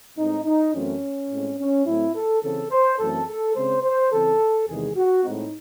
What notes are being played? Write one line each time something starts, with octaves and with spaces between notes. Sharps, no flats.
A2 G#3 C4 D#4
D#4
F#2 E3 A3 C4 C#4
A2 G#3 C4
C#4
A2 F#3 A3 C4 E4
A4
C#3 E3 C4 A4
C5
F#2 E3 A3 C4 A4
A4
C#3 G#3 C4 C5
C5
C#3 E3 C4 A4
E2 C3 D#3 G#3 G#4
F#4
A2 G#3 C4 D#4